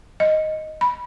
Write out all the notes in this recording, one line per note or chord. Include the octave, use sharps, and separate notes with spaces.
D#5
B5